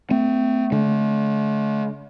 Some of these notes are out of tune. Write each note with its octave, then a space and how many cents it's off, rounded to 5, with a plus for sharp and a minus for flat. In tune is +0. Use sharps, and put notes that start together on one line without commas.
A3 +20 C4 -30
D3 -40 A3 -45